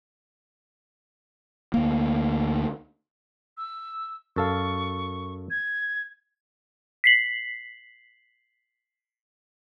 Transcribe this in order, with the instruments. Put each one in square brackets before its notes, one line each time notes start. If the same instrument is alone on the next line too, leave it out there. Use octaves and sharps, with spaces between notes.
[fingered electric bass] D2 A#3
[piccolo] E6
[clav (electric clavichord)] F#2 A4 F5 [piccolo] C#6
[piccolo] G#6
[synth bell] B6 C7 F#7